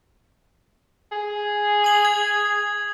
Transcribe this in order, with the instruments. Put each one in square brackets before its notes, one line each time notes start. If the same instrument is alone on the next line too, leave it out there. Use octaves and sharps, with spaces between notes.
[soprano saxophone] G#4
[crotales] D#6 F#7
G#6